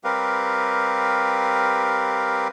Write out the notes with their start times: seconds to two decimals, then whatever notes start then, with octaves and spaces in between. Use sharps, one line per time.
0.04 G3 C4 G4 A#4 B4 F5